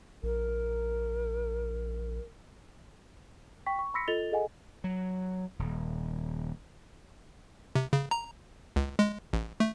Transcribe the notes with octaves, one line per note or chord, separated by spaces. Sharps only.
A#1 A#4
G5 C#6 B6
C#6
B5 C6 E6 A#6 B6 C#7
F4 A4 D#5 A6 F7 G7
G#4 A4 D#5 F#5 G#5
F#3
D#1
C3
C#3
A#5
C#2
G#3
A1
A3